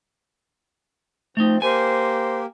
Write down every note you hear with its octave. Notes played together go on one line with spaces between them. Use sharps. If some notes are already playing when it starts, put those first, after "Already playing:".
F3 A3 C4 D#4
A#3 G4 A#4 C5 G#5